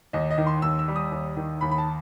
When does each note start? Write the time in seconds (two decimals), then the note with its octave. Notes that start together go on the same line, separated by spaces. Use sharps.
0.13 D#2 D#5
0.31 D#5
0.38 D#3
0.47 C6
0.62 D#2 E6
0.79 E6
0.88 G3
0.96 D#6
1.12 D#2
1.37 D#3
1.61 D#2 B5
1.71 B5
1.78 A5